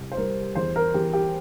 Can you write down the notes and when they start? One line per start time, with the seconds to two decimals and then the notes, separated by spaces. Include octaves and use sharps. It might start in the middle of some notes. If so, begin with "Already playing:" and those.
Already playing: C2
0.12 C5
0.17 G3 A#4
0.56 E2 C5
0.76 A#4
0.94 E2 G4
1.13 G4